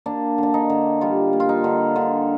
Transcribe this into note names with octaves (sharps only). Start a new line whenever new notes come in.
A#3 D4
D3 D4
D#4
D3
G3 F4
A#3
F4
D#4
D3
D3